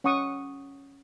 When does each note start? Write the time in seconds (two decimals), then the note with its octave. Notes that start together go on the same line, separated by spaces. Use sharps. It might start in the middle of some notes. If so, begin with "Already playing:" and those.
0.04 C#4 F#5 C#6 D#6